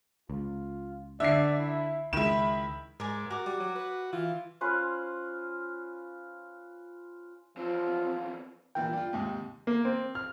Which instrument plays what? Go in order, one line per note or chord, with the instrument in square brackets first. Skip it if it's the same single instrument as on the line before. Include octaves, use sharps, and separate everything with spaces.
[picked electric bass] C#2 [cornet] F4
[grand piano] D3 C7 [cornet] D5 [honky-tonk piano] E5
[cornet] E4
[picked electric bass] C#2 G#3 [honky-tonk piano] D#3 E4 [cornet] B5 [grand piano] E7
[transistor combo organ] G#2 [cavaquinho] A#4 D5 G#5
[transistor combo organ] F#4 [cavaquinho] A#4 D6
[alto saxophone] G3 [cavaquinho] D6
[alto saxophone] F#3
B4
[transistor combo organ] E3 [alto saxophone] F4
[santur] C#4 F4 B4 C5
[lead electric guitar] E2 C4 [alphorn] F3 [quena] F4
[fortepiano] A#2 E3 A#4 [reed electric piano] G5
[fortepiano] G3 F4
D#2 G#2 C3
A#3
C4
F6